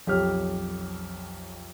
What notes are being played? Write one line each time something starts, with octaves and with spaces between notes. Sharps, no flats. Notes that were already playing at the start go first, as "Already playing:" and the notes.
B1 F2 G4 C#5 F6